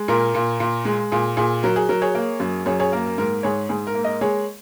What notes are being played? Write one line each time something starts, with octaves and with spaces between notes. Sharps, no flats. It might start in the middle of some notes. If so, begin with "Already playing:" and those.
Already playing: G#3
A#2 A#4
A#2
A#2
G#3
A#2 G#4
A#2 G#4
F#3 A#4
G#4
F#3 A#4
G#4 C#5
A#3
F#2
F#2 G#4 C#5
G#4 C#5
A#3 A#4
A#4
G#2 A#4
G#2 G#4 C#5
G#2 G#4
A#4
A#3
A#4 D#5
G#3 G#4 C#5